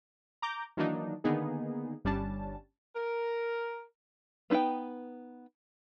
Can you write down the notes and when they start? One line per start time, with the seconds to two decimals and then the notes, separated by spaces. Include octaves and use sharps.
0.42 A#5 D6 G6
0.77 D#3 E3 F#3 A#3 D4 D#4
1.24 D3 D#3 A#3 B3 D#4 G#4
2.05 G1 G3 C#4 D4 A5
2.94 A#4
4.50 B3 D#4 E4 B4 G5